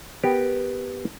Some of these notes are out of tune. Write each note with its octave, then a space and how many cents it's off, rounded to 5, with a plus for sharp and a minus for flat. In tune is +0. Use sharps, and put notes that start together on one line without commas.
B3 +0 G4 +0 A#4 +0